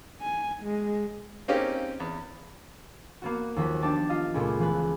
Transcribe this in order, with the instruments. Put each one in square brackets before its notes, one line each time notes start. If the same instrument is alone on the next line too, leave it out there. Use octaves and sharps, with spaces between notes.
[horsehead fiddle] G#5
G#3
[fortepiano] A#3 C4 C#4 D#4 G4
E2
[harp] A#3 B3 F#4
D#2 F3 F#3 B6
D4 D#4 G4 A5
F4 D#5 F5
C#2 A#2 A3 B5
E3 F3 G#3 B4